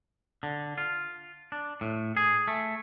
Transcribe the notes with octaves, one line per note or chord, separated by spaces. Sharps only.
D3
F4
D4
A2
G#4
A3